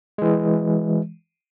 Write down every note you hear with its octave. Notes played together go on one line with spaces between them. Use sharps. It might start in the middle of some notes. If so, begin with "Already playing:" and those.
E3 G#3